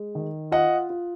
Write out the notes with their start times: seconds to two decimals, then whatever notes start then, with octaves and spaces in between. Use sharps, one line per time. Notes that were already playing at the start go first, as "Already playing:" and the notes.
Already playing: G#3
0.15 D#3
0.51 F4 D#5 F#5
0.90 F4